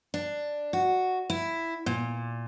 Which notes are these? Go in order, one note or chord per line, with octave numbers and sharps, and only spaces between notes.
D4
F#4
E4
A#2